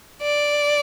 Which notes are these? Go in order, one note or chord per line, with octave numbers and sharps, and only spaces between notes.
D5